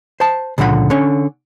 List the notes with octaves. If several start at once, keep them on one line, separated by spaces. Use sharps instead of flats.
C5 A5
C#2 A#2 D3 F3 F#5 B5
D3 C#4 C#5